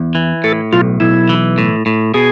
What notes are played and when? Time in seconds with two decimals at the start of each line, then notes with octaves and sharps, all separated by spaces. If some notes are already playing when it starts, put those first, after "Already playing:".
Already playing: E2
0.15 E3
0.44 A2 A4
0.72 B1 F4
1.00 B1 E4
1.29 E3
1.58 A2
1.86 A2
2.14 B2 G#4